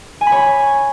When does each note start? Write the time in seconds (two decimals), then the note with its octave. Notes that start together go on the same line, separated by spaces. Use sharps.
0.21 G#5
0.26 B5
0.32 C#5